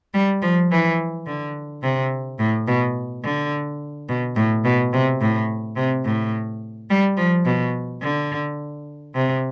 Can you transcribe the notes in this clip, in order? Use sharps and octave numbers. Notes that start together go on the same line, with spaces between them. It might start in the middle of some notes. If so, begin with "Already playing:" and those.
G3
F3
E3
D3
C3
A2
B2
D3
B2
A2
B2
C3
A2
C3
A2
G3
F3
B2
D3
C3